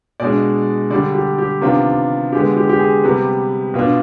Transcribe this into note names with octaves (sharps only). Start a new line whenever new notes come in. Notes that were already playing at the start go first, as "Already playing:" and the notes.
B2 G#3 D4 D5
D3 G3 D4 D5
G4
G4
C3 D#3 B3 D4 F4
D3 G#3 B3 G4
G4
G4
G#4
C3 G3 B3 B4
B2 B3 D4 F4